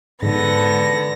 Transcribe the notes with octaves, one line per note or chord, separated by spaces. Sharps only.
G#2 D3 B3 A#6